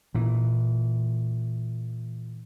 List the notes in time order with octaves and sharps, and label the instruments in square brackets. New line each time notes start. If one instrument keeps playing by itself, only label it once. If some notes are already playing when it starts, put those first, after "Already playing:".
[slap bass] A#2 E3